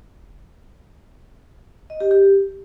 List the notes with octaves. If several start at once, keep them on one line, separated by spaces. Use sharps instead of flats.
D#5
G4
G4